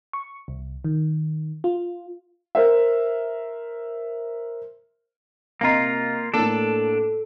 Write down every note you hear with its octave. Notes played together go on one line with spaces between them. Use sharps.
C#6
C2
D#3
F4
A#4 C5 E5
C3 A#3 F4 D#5 A#5
A2 A#3 D4 A4